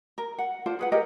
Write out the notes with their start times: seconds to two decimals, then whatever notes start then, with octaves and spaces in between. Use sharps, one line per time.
0.18 A#4
0.38 F#5
0.66 F4 A4 C5 D5
0.79 G#4 B4 F#5
0.92 G4 G#4 A#4 D#5